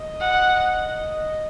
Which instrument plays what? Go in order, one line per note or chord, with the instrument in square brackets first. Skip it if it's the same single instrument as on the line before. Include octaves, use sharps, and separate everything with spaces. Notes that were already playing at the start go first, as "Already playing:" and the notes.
Already playing: [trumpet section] D#5
[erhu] F#5